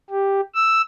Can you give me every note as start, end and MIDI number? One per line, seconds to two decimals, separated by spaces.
0.10 0.41 67
0.54 0.81 88